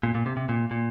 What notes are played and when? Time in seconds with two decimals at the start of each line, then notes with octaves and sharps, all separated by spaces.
0.03 A#2
0.15 A#2
0.26 C3
0.37 C3
0.49 A#2
0.71 A#2